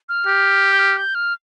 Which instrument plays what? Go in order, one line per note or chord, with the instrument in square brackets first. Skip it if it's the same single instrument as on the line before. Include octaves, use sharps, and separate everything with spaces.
[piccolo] F6
[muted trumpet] G4
[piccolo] G6
F6
G6
F6